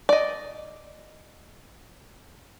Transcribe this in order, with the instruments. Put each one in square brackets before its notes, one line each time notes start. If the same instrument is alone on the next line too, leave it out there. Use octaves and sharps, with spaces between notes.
[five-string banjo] D5 D#5